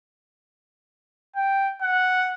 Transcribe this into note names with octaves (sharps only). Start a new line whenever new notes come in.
G5
F#5